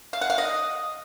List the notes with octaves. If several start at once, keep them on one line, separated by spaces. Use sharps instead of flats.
F5
F#5
F5
D#5